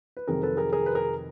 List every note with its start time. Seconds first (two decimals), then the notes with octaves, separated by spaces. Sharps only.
0.17 B4
0.27 F2 C3 D#3 F#3 G#4 A#4
0.43 A4 B4
0.57 G#4 A#4
0.72 G#4 A#4
0.86 B4
0.95 G#4 A#4